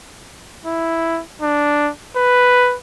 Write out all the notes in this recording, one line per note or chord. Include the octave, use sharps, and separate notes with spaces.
E4
D4
B4